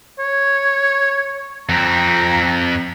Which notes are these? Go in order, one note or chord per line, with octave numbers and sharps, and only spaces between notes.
C#5
F2 C4 A#5